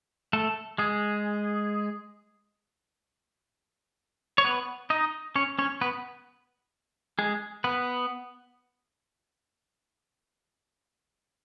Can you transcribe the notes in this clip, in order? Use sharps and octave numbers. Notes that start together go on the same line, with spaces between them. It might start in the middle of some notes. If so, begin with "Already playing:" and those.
A3 A4
G#3 G#4
C#5
B3 B4
D#4 D#5
C#4 C#5
C#4 C#5
B3 B4
G#3 G#4
B3 B4